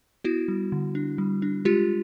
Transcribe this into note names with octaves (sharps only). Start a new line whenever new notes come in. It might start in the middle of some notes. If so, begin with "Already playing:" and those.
B3 E4 F#4
G3
D3
D4
G3
D4
G#3 F4 G4